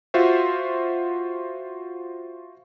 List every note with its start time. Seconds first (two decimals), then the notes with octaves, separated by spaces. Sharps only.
0.14 F4 F#4 C5 E5